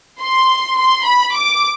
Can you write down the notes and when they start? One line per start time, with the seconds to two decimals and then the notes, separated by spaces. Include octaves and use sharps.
0.21 C6
0.78 C6
1.06 B5
1.35 D6